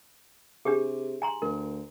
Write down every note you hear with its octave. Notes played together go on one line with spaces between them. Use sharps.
C3 D4 G4 G#4
G#5 A#5 C6
D2 A#4